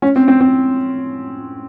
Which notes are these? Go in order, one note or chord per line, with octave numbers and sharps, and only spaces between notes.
C#4
C4
C4
C4